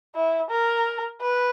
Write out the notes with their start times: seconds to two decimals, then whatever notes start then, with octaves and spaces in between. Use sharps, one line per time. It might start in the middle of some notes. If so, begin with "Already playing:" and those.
0.15 E4
0.51 A#4
1.22 B4